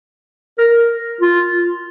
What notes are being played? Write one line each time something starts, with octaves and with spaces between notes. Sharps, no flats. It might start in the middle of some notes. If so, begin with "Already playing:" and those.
A#4
F4